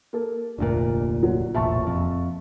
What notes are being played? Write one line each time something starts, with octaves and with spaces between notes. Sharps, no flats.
A#3 A4
F1 D2 A#2 A#3 D4
D3 F#3
E1 A1 A#2 E5 A5 C#6
F2